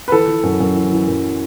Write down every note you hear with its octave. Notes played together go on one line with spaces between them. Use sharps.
B4
E3 A4
E3
F#2
F#2
E3
E3
F#2